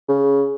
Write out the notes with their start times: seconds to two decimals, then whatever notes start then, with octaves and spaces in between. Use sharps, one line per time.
0.09 C#3